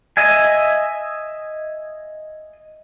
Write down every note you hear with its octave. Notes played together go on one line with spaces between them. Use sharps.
D#5 E5 G#5